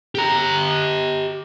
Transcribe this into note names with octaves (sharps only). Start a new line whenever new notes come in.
G4 A#5